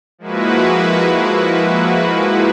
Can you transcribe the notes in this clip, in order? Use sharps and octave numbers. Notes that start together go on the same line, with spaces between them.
F3 G#3 A#3 E4 F#4 B4